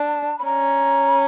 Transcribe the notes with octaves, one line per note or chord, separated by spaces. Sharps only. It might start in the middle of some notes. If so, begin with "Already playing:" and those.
Already playing: D4 A5
B5
C#4 A#5